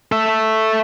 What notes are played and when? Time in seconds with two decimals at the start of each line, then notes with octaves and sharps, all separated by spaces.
0.12 A4 E5